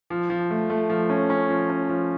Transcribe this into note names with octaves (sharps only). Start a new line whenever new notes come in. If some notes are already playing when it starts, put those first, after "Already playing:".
F3
F3
A3
A3
F3
C#4
C#4
F3
C#4
F3